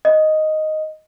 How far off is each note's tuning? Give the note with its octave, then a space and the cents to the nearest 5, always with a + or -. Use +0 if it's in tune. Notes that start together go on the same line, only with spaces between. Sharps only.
D#5 +0